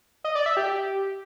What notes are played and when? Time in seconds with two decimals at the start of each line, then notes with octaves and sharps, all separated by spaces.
0.24 D#5
0.35 D5
0.46 E5
0.57 G4